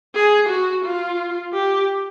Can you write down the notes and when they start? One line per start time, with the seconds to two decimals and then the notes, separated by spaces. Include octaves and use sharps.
0.15 G#4
0.49 F#4
0.85 F4
1.53 G4